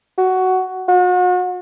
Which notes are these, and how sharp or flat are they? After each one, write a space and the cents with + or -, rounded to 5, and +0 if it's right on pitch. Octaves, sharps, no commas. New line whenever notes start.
F#4 +10
F#4 -40